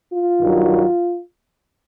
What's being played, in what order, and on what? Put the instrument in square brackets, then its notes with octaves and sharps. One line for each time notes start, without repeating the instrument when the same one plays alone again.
[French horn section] F4
G2 D#3 F#3